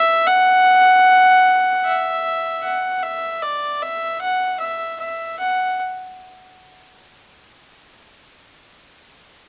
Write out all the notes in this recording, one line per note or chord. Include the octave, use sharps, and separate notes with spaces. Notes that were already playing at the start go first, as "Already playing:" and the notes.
Already playing: E5
F#5
E5
F#5
E5
D5
E5
F#5
E5
E5
F#5